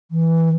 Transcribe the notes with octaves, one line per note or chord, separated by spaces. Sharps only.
E3